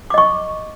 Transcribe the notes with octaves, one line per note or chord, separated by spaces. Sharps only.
D#5 C#6 D6